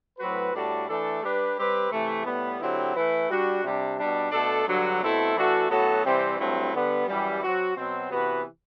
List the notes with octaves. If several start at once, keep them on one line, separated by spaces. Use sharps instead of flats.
A2 F#3 C4 F#4 B4
A2 G3 D4 F#4 A4
E3 A3 D4 A4
G3 D4 G4 B4
G3 C4 G4 B4
C3 E3 A3
A2 G3 B3
D3 F#3 C4 E4 G4
E3 A3 E4 B4
G3 D4 F#4
C3 G3 D4
B2 G3 D4
B2 A3 D4 A4
G2 D3 F#3
B2 A3 C4 E4 A4
E3 A3 D4 F#4 A4
A2 F#3 B3 F#4 A4
C3 E3 G3 C4
G2 F#3 A3 C4 E4
D3 G3 B3
F#2 E3 G3
F#3 C4 F#4
B2 F#3 C4
C3 E3 B3 F#4 B4